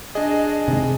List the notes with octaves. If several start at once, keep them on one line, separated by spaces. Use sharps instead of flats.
D4 G#4 D#5
C3 D#3 G#3